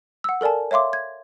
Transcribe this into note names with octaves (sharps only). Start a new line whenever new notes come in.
F#5 E6
A4 A#4 D5 G#5 A5
C#5 E5 F5 C6 D6
G#6